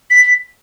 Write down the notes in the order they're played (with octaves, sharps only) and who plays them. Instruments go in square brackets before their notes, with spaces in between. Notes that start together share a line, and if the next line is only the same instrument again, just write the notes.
[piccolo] B6